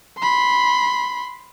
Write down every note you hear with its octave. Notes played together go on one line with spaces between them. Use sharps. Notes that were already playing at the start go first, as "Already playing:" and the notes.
B5 C6